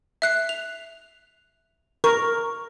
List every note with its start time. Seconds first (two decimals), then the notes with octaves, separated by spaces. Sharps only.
0.22 E5 F#6 C7
0.49 F7
2.04 A#4 C#6